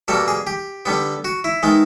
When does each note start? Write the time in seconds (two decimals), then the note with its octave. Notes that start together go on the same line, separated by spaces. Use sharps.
0.08 B2 G3 A#3 A4
0.28 G#4
0.47 G4
0.86 D3 G3 B3
1.25 F#4
1.44 E4
1.63 D#3 G#3 B3